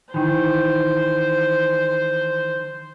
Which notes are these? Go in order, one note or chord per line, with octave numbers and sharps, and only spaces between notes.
D#3 E3 C5